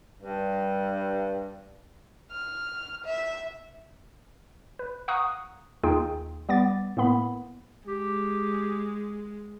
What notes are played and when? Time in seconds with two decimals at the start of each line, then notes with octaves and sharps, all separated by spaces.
0.22 G2
2.31 F6
3.04 E5
4.79 B4
5.08 F5 F#5 A#5 C#6 D#6 F#6
5.83 D#2 D#4 F4 G#4 G5
6.49 G3 B3 D6 A6
6.97 A2 A#3 B3 B5
7.88 G#3 G4